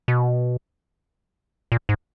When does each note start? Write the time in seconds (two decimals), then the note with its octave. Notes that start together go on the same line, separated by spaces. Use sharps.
0.08 B2
1.72 A#2
1.89 G#2